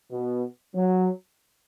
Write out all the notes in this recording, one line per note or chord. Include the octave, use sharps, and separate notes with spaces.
B2 B3
F#3